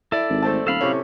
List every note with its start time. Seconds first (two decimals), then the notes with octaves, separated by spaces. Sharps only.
0.12 E4 A4 D5
0.29 G#1
0.42 A3 C4 A5
0.67 D#1 A4 F5 B5
0.81 A2 C3 A3 C#4